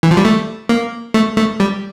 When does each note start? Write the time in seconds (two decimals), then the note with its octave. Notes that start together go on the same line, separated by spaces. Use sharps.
0.03 E3
0.11 F3
0.17 G3
0.25 A3
0.69 A#3
1.14 A3
1.37 A3
1.60 G3